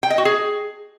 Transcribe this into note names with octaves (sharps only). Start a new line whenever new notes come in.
G5
D#5
F#4
G#4